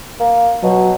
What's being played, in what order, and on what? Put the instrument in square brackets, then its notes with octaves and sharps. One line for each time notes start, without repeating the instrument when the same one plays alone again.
[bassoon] A#3
[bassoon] B2 [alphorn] F#3